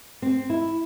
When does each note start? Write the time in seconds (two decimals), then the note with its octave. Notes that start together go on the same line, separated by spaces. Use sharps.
0.22 C4
0.50 E4